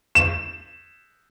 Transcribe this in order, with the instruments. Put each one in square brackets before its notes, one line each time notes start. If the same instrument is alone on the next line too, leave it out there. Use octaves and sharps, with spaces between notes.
[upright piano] E7